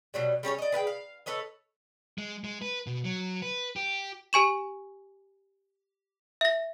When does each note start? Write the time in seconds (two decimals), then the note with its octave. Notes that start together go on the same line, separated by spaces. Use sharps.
0.14 B2 F#3 G3
0.43 G3 C#4 G#4 C#5
0.58 D5 D#5
0.72 G#4 B4 F5 G5
0.87 F5
1.26 A4 B4 C#5 D#5
2.18 G#3
2.44 G#3
2.62 B4
2.87 B2
3.05 F#3
3.42 B4
3.76 G4
4.33 G4 G#5 C#6 E7
6.41 E5 A#6